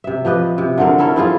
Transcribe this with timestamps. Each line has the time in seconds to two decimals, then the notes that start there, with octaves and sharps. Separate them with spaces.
0.04 C3 E5
0.25 F3 G4 B4 D#5
0.58 C3
0.78 D3 A3 C4 A#4
0.98 C#4 E4 A4 A#4
1.16 C4 E4 F4 G#4